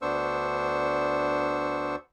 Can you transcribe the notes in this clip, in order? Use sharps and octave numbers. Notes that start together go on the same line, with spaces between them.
D2 B3 D4 C5 C#6 E6